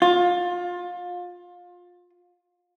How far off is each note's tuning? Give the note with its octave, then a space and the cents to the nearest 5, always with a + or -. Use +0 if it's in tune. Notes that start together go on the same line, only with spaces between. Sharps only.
F4 +25